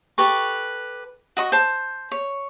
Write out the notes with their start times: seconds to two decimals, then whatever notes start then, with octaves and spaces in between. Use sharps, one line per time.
0.18 G4 A4 B4 C#6
1.37 F#4 D#5 B5 C#6
1.52 C5 A5
2.12 C#5